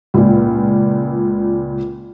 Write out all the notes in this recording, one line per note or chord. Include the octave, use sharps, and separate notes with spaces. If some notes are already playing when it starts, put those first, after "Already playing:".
C#2 A#2